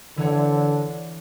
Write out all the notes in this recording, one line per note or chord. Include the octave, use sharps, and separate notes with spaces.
D3 E3 C#5